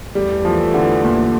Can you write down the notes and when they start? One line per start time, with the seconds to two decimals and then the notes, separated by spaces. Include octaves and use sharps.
0.15 E2 E3 G3 A3
0.45 F3
0.74 D3
1.04 A#2